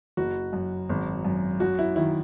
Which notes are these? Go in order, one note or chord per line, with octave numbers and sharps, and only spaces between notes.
F#1 F#4
F#2
G#1
F#2
F#2 F#4
E4
D#3 E4